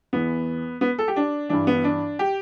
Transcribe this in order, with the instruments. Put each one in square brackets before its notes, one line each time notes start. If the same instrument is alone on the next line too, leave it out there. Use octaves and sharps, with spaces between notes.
[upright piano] E2 E3 B3
B3
A4
G4
D4
G2 E3 D4
B3
D4
G4